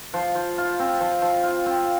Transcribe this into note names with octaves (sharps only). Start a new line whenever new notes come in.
F3
F3
F4
C4
F3
F3
F4
C4